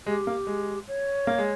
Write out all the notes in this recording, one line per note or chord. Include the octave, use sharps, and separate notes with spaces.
G#3 G4
A#3
G#3
C#5
A#3
G#3